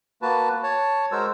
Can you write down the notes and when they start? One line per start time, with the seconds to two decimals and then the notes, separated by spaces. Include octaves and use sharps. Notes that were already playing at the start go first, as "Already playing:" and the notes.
0.22 A#3 F#4 B4 A5
0.63 C#5 A5
1.12 G#3 F#4 A#4 C5 E6